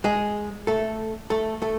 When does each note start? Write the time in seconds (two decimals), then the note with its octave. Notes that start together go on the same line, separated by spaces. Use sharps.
0.04 G#3 G#4
0.67 A3 A4
1.30 A3 A4
1.62 A3 A4